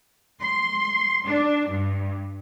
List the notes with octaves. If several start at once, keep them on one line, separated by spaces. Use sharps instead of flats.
C6
D4
G2